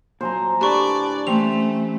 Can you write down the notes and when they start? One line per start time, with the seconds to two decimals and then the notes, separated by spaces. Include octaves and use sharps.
0.21 A#2 F3 F#3 C5 G#5 A#5
0.61 A2 D3 G4 B4 D5 A5 C#6
1.27 E3 G3 A3 C4 C#4 F7